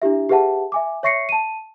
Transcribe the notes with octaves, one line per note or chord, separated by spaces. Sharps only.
D4 E4 G4 E5
G4 G#4 B4 E5 F#5 A5
E5 G#5 D6
C#5 E5 C#6 A#6 C7 C#7
A5 D#7